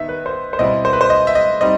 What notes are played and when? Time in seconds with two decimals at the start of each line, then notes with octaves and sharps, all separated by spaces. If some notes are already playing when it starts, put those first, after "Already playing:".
Already playing: D#3 B3 D#4 E5
0.09 B4
0.26 C5
0.53 C5
0.59 B2 G3 C4 E4 D#5
0.85 C5
0.93 B4
1.01 C5
1.10 D#5
1.27 E5
1.35 D#5
1.61 G3 C4 D#4 D#5